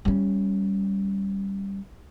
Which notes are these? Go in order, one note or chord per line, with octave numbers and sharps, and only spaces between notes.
G3 C#4